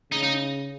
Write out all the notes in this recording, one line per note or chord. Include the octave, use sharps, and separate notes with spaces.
C#3 D#4
D#4